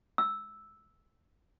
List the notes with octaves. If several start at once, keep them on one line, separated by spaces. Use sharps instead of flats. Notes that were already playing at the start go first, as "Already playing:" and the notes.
E6